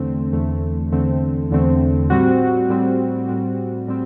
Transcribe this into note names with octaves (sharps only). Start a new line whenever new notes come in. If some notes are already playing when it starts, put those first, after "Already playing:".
Already playing: E2 D3 A3 C4
E2 D3 A3 C4
E2 D3 A3 C4
E2 D3 A3 C4
A2 G3 C4 F#4
A2 G3 C4 F#4
A2 G3 C4 F#4
A2 G3 C4